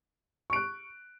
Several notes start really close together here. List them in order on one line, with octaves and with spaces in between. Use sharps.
C#6 D7 F#6